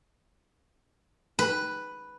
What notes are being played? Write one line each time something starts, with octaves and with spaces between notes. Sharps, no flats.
B4